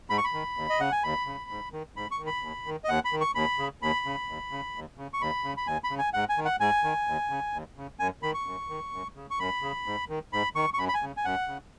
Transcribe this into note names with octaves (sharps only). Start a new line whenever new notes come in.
G#2 B5
C#6
B5
D#3
D#2
D#5
C#3 F#5
G#5
D#2 B5
C#3
G#2
D#3
G#2 B5
C#6
D#3
B5
D#2
D#3
D#5
D#2 F#5
B5
D#3
C#6
D#2 B5
C#3
D#2 B5
C#3
D#2
C#3
D#2
C#3
C#6
D#2 B5
C#3
B5
D#2 G#5
B5
C#3
G#5
G#2 F#5
G#5
D#3
F#5
G#2 G#5
D#3
D#2
C#3
D#2
C#3
F#2 G#5
D#3 B5
C#6
F#2
D#3
F#2
C#3
C#6
F#2 B5
C#3
G#2
D#3
G#2 B5
D#3 C#6
C#6
F#2 B5
B5
G#5
C#3
G#5
F#2 F#5
C#3